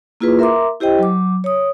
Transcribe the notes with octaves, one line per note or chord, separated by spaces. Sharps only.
A#3 E4 F4 G#4 B4
A#4 E5 A#5 C6 D6
E4 G4 C5 D#5 G5
F#3 D6
C#5 D#6